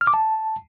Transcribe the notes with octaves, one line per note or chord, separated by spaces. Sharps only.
F6
D6
A5